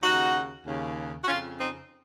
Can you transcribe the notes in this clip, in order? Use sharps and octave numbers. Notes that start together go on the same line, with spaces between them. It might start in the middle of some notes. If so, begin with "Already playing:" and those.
D#2 C#3 D#4 F#4
D#2 C#3
F#4
F2 C#3 C#4 F4
C4 D#4